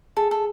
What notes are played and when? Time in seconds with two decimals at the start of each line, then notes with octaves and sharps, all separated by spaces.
0.17 G#4 A4
0.31 A4